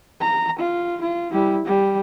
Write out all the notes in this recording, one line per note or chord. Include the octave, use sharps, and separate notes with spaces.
A#5
F4
F4
G3 E4
G3